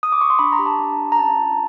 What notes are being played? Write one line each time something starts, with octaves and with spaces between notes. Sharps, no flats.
D#6
D6
C#6
C6
D4 B5
A#5
G4
A5
D4
G4
A#5
C#4 A5
F4